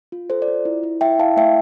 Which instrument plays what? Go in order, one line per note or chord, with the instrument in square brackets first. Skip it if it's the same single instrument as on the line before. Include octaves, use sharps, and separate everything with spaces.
[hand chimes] F4
A4 C5
D5
F4
E4
E4
E4 E5 G5
E4 F5 A5
A3 E5 G5